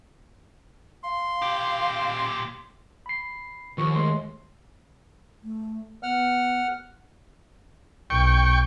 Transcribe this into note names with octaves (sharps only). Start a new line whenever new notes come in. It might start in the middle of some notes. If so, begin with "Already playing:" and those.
F5 C6
A#2 G4
B5 C7
D#2 F3 C#6
G#3 A3 C6
A3
B3 F#5 F6
B1 G5 C#6